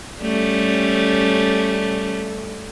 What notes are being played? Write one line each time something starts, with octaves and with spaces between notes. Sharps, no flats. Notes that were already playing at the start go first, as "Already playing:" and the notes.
G3 A3 C#4